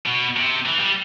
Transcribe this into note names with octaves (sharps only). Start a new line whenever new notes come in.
B2
C3
E3
G3